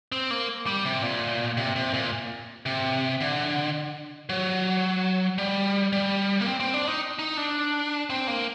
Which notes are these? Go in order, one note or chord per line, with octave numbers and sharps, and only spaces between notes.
C4
A#3
G3
C3
A#2
C3
C3
A#2
C3
D3
F#3
G3
G3
A#3
C4
C4
D4
D#4
D#4
D4
C4
A#3